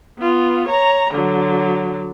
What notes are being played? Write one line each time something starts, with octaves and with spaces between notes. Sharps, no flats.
B3 F4
C#5 A#5
D3 F#3